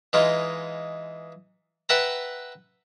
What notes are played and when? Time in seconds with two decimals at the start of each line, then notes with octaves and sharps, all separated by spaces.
0.13 E3 G#3 D#4 F4
1.89 B4 E5 F#5 G5 A5 A#5